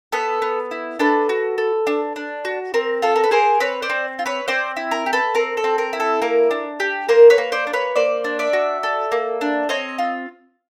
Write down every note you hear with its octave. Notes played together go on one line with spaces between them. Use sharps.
B3 A4 B4
B3
E4
D4 A4 B4
F#4
A4
D4
D4
F#4
C4 A#4
F4 A4
A#4
B4
G#4 A#4 C5
C4 B4 C#5
C5 D5
C4
F4
B4 C#5
C4 C5 D5
E4
A#4
G4
A4 B4
C4 A#4
A4
C4
A#4
E4
A4
A#3 A#4
D4
G4
A#3 A#4 C5
B4 C#5
A#3
C5 D5
D4
B4 C#5
A#3 C5 D5
D4
D5 E5
F#4
A4
A#3
D4
C4 C#5 D#5
F4